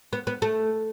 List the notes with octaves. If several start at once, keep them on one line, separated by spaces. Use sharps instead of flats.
B3
B3
A3